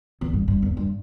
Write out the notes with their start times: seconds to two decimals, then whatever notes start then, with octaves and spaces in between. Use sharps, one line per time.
0.21 E2
0.33 G2
0.48 G2
0.62 E2
0.77 G2